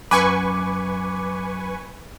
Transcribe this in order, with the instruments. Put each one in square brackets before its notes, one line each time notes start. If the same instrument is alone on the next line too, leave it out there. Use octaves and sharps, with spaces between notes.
[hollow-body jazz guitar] F#2 [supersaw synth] B4 G#5 C#6 [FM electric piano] D6